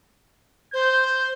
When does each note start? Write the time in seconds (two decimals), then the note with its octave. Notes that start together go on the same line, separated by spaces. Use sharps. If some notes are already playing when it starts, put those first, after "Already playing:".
0.74 C5 G6